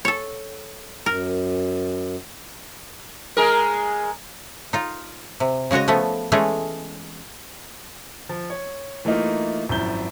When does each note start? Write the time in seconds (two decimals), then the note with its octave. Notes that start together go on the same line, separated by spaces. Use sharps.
0.05 A4 C#5
1.06 F#2 A#4
3.37 G#3 G#4 A#4
4.73 D#4 F4
5.40 C3
5.71 C#3 G#3 F#4 C#5 D#5
5.88 F3 A3 B3
6.32 E3 G#3 A3 C#4 G#4
8.29 F3
8.50 C#5
9.05 E3 A3 A#3 D#4 F4
9.69 G#1 F#2 F3 E4 G6 G7